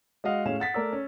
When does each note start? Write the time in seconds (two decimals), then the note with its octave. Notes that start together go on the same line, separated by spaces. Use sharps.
0.24 G#3 F#4 D#5 F5 F#5
0.45 A2 C#4 G#4 F5 E7
0.60 F#5 A6 B6
0.74 A3 A#4 D5 E6
0.92 C#4